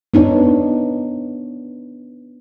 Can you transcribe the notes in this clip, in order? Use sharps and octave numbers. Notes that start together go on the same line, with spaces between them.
B3 D4 D#4 C#5